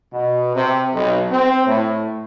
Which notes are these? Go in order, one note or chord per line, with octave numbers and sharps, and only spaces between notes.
B2
C3
B1
C4
A2